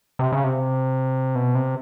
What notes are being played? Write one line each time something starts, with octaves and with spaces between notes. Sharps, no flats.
C3
C#3
C3
B2
C3